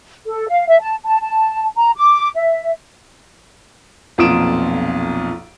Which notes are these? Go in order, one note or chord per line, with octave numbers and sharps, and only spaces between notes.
A4
F5
E5
A5
A5
A5
A#5
D6
E5
B1 F2 A#2 D#6 D7 E7